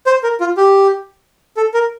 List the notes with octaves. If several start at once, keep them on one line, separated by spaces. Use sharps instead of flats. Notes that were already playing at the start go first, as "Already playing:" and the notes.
C5
A#4
F4
G4
A4
A#4